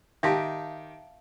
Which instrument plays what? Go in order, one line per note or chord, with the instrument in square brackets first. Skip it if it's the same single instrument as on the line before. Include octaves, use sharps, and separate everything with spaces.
[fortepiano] D#3 G4 [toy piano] E5 F5 A5